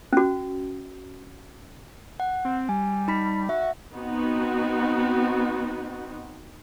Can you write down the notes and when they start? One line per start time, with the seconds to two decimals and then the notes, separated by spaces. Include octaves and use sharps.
0.13 C#4 F#4
2.20 F#5
2.45 C4
2.69 G3 G#5
3.08 D#4 B5 B6
3.49 F#4 E5
3.92 B3 C4 D#4 F#4